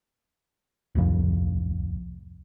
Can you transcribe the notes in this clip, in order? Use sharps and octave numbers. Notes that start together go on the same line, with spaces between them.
D1 C2 F2